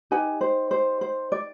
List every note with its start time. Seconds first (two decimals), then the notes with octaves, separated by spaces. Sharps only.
0.11 D#4 G4 B4 G#5
0.41 C5
0.71 C5
1.01 C5
1.32 D5